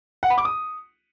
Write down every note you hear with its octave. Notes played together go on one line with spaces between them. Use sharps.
F#5
B5
D6
D#6